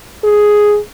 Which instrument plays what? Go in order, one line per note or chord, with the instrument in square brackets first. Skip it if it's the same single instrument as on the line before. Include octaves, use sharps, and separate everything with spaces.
[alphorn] G#4